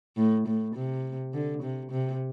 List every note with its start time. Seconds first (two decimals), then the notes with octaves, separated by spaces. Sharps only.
0.17 A2
0.47 A2
0.75 C3
1.34 D3
1.63 C3
1.91 C3